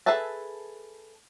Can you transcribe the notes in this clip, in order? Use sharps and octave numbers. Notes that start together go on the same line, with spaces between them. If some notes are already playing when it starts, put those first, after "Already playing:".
G#4 A4 B4 E5 A5